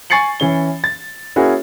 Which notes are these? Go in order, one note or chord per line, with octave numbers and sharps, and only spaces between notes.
G#5 C#6 A6 C7 C#7 F#7
E3 C#4 G7
A6
A#3 C#4 E4 F#4 G#4